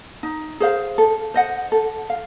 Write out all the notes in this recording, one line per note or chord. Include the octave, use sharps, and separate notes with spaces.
D#4
G#4 C5 F5
A4
C5 D#5 F#5
A4
F5